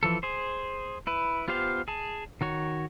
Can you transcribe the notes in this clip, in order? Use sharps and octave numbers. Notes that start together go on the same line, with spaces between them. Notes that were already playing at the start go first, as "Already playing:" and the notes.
E3 F3 A4
G#4 C5
E4 B4
B3 F4 G4 C5 F5
G#4 A5
D#3 F#4 C#5